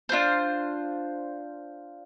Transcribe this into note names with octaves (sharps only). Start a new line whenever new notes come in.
D4 F4 C5